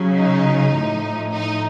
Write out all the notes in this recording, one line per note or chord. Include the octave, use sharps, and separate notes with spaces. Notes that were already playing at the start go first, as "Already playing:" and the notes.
Already playing: C#3 F#3
D#4
A2 F3
D#4